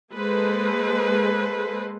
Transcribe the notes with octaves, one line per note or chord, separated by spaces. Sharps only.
G#3 A#3 A4 B4 C5